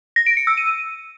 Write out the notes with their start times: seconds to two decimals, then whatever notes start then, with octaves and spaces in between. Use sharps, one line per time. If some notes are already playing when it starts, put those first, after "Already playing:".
0.16 A#6
0.26 D7
0.37 C#7
0.47 E6
0.57 D#7